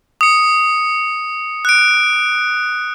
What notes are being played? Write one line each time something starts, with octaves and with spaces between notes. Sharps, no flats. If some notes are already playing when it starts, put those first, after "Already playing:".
D#6 C#7
F#6 D7